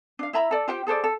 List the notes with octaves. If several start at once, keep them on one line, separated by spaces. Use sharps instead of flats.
D4 F5
E4 E5 A#5 B5
A4 D5
F4 G4 C5 G5
G#4 A4 C5 D5
A4